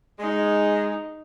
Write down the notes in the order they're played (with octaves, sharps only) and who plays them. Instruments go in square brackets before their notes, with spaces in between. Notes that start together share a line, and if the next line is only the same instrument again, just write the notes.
[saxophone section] G#3 [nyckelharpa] D#4